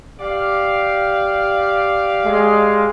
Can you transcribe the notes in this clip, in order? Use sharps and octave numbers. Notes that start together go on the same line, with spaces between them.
G4 D5 F5
G#3